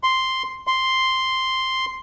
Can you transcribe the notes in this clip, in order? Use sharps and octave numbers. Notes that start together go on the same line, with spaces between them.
C6
C6